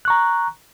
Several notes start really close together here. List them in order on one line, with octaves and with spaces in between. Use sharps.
F#6 C#6 A#5